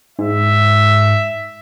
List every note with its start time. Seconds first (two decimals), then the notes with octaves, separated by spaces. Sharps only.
0.19 G#2 E5